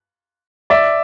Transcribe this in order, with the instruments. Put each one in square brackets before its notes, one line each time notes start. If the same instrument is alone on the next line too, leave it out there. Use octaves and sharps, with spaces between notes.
[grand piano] D5 E5